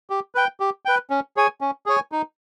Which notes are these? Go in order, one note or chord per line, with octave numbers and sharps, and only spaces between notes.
G4
B4 G5
G4
B4 G5
C#4
G#4 C#5 G#5
C#4
G#4 C#5 G#5
D#4